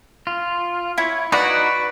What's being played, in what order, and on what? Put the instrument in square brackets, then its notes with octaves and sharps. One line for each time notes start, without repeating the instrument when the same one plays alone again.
[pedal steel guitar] F4
[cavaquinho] E4 C#5
[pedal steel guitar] D#4 F#4 F#5 [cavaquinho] B4 D5